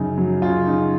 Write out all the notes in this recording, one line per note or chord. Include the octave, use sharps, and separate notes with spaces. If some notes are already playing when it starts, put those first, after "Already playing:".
Already playing: F#2 C#3 D#4
F#3
C#3 F4
C#3 D#4